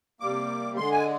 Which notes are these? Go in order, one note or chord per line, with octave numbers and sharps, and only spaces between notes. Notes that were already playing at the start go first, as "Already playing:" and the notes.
C3 G3 A#3 D6
D3 G#3 C6
G#5